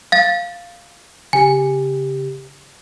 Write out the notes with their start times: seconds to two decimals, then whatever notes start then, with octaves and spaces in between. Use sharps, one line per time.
0.12 F5 A6
1.33 C#3 G4 G#5